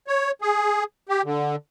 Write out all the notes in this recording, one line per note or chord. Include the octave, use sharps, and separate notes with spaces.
C#5
G#4
G4
D3